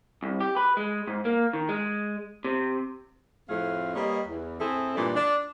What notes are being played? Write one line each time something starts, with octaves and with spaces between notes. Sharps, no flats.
C2
G4
B4
G#3
G#2
A#3
D#3
G#3
C3
F2 A2 A3 C4 G#4 F5
G3 A#3 B4 C#5 D#5
E2
A2 C4 E4 G#4 A4
G2 A#2 E3 A3 D4 D5
D4